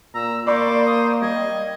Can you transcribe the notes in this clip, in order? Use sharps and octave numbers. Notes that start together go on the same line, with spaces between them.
A#2 A#5 E6
A#3 C5 D5 B5 C#6 D6
D#6
G3 D#5 G#6